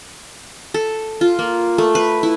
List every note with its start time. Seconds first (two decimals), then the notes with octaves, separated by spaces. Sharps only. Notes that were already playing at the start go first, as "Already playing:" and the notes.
0.74 A4
1.21 F4
1.39 A#3
1.78 A3
1.95 B4
2.23 E4